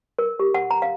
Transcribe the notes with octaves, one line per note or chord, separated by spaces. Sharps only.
A#4
G4
F#5
A#5
F5